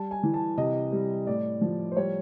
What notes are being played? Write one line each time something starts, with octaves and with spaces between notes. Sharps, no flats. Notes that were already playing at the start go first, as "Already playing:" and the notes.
Already playing: G3 A5
G#5
E3
A5
C3 D#5
G3
A2 D5
F3
C5
G3 C#5